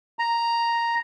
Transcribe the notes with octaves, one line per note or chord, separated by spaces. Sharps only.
A#5